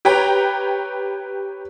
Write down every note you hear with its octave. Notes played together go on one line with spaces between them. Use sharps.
G4 B4 C#5 G5 A#5